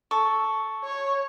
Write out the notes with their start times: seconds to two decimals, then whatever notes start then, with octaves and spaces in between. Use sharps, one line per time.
0.11 A4 C#6
0.84 C#5